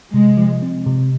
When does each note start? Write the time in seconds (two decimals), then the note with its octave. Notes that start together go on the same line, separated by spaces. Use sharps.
0.13 C3 G#3
0.37 F3
0.62 C4
0.87 C3